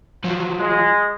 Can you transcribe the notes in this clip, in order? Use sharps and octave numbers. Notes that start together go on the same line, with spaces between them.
F3 F#3
G#3